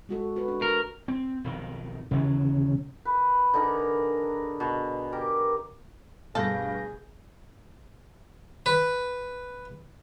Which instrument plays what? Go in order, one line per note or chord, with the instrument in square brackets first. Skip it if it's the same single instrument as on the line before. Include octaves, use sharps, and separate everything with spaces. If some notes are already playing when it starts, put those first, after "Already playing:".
[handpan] G#3 F#4 A4
F#4 B4
D4
[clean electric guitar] A#4
[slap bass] C4
B1 F2 D#3
[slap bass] D#2 E3 F#3 [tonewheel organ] C#3
[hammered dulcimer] B4
D3 D#4 G#4 A#4
B2
G4 A#4
[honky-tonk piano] D2 G2 B2 [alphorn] G#4 [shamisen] A4 [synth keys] F5 G6 A#6
[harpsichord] B4